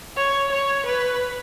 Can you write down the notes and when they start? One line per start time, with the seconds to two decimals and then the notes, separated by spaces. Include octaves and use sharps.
0.17 C#5
0.52 C#5
0.86 B4